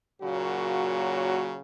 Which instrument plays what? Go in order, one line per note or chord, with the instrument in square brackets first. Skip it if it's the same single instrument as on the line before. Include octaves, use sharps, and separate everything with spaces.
[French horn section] A#2 C#3 F#3 A#3 F#4